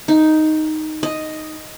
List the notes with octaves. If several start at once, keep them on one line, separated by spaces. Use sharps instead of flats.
D#4
D#5